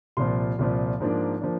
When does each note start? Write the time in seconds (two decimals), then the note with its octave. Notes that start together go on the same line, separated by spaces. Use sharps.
0.17 C2 A#2 F3 C6
0.59 C2 A#2 F3
1.00 G#2 F3 A#3 D4
1.41 F3 A#3 D4